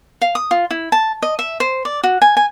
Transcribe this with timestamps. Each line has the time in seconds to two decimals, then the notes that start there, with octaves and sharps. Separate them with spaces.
0.22 F5
0.35 D#6
0.51 F4
0.71 E4
0.92 A5
1.22 D#5
1.39 E5
1.60 C5
1.85 D5
2.04 F#4
2.22 G#5
2.37 G#5